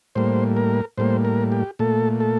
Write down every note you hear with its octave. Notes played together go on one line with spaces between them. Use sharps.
A2 G3 A#3 C5
A#4
A2 G3 A#3 C5
A#4
G4
A#2 A3 A4
A4